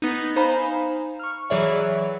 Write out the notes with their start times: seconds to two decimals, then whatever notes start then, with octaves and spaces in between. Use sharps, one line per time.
0.02 B3 D#4
0.36 D#4 C5 F5 G#5 A#5 B5
1.19 C#6 F6
1.50 E3 F#3 G#4 C#5 D5 E5